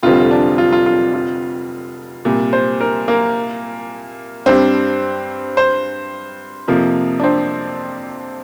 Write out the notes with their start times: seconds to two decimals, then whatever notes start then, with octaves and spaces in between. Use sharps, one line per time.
0.03 F1 F2 D3 G3 C4 F4
0.31 D4
0.58 F4
0.72 F4
0.86 F4
1.14 F4
2.25 C2 A#2 G3
2.53 C5
2.81 A#4
3.08 A#3
4.46 G2 G3 C4 D4 G4
5.57 C5
6.68 F2 C3 F3 A#3
7.20 D4
7.24 C4